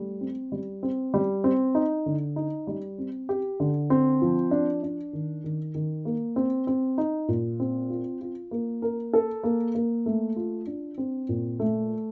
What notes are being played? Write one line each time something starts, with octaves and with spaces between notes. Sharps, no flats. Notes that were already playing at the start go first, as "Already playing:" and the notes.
Already playing: G3 A3
C4
G3
C4
G3
C4
D#4
D3
D#4
G3
C4
G4
D3
C4
F3
D4
D4
D#3
D#3
D#3
A#3
C4
C4
D#4
A#2
C4
F4
F4
A#3
A#4
A4
A#3
A#3
A3
F4
D4
C4
A#2
A3